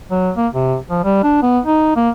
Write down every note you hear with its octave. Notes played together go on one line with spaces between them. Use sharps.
F#3
A#3
C3
F3
G3
D4
B3
D#4
A#3